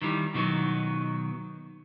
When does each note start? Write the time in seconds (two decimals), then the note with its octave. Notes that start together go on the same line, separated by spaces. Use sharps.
0.02 D#3 E3 G3
0.34 B2 D#3 F#3 B3